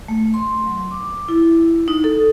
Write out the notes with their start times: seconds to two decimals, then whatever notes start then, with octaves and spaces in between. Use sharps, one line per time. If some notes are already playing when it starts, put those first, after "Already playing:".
0.08 A3
0.34 C6
0.66 F#3
0.91 D6
1.28 E4
1.88 D#4
2.04 A4